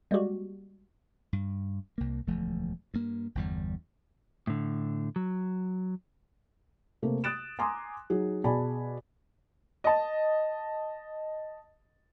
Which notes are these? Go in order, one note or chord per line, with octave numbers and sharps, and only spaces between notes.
G3 G#3 A#3 F#4 G4
G2
C2 A#3
E1 D2 F3 A3
G2 A#3
G1 E2 G3
A2 D3
F#3
C3 A3 A#3
D#6 F#6 A6 D7 E7
G#5 A#5 C6 D6 D#6
F#3 D#4 G#4
B2 G#4 D5 G#5 A5 B5
D#5 A5